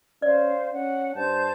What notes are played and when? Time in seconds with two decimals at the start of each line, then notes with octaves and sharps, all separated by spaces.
0.22 C#4 C5 D5 F5
0.73 C#4 F#5
1.16 G2 C5 A5 G6